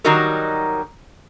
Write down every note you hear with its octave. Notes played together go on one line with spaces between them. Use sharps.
D#3 F#3 G3 D#4 F#4 A#4